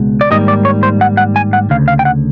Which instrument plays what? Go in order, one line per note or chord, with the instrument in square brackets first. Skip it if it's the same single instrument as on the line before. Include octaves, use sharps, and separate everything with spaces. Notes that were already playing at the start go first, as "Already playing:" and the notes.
Already playing: [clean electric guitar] C#2 B2 G#3
D5
G#2 D#3 G3 A#3 D#5
D5
C#5
C5
F#5
F#5
G#5
F#5
D2 C#3 F5
F5
G5
F#5